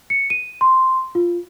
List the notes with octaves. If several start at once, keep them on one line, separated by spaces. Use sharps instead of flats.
C#7
D#7
C6
F4